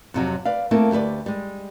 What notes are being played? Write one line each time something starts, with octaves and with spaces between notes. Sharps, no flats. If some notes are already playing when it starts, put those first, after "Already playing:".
F2 C3 F#3
B4 D5 F5
A3 A#3 C4 E4
D2 G4 A4 B4 D5
G3 G#3